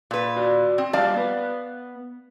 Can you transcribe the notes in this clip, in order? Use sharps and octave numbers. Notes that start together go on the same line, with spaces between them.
A#2 B4
F#4 D5
C4
G3 F4 G4 D5 F5 A5
B3 B4